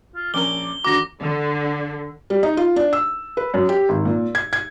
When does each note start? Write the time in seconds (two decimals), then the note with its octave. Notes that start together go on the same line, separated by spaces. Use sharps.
0.15 F4
0.34 A#1 C#4 A#4 D6 G7
0.84 E1 D3 F#4 A#5 D6 A#6
1.21 D3
2.30 G3
2.43 D#4
2.57 F4
2.76 D4
2.93 E6
3.37 B4
3.54 F#2
3.69 G4
3.89 G#1
4.05 A#2
4.35 G#6
4.53 G#6